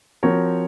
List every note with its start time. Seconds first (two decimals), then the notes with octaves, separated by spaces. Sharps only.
0.23 F3 C4 F#4 A#4 C#5